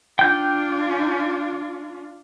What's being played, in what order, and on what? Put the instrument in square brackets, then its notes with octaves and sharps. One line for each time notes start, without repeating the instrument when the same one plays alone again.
[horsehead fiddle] D4 F4 [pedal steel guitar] G5 G6